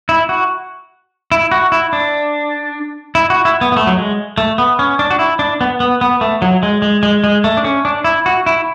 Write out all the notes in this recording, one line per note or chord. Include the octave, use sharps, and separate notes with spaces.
E4
F#4
E4
F#4
E4
D4
E4
F#4
E4
B3
B3
A3
F#3
G#3
A3
B3
C#4
D4
F#4
E4
D4
B3
B3
B3
A3
F#3
G#3
G#3
G#3
G#3
A3
D4
C#4
D4
E4
F#4
E4